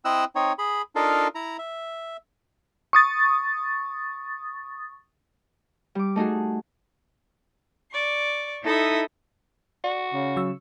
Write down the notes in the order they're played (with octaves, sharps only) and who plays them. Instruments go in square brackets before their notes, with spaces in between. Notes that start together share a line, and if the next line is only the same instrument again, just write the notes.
[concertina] C4 E4 D#5 E6 F#6
C4 D#4 C#5
G#4 B5
D4 D#4 F4 A4 A#4 F5
E4 A#5
E5
[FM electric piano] C#6 D#6 A6
[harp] G3 D6
A3 D#4 F#4 G#4
[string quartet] D5 C#6
D#4 E4 A4 E5 D#6
[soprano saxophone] F#4 [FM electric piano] D5
[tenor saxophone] C#3
[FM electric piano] F#3 C#6 E6